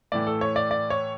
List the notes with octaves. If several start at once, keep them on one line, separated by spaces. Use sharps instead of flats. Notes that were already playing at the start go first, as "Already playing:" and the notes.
A2 E3 A3 D5
A4
C#5
D5
D5
C#5